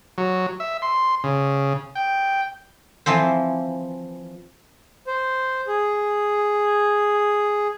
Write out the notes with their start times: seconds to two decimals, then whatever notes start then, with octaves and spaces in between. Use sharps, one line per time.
0.18 F#3
0.60 E5
0.82 C6
1.24 C#3
1.95 G5
3.06 E3 F3 C4 C5
5.07 C5
5.67 G#4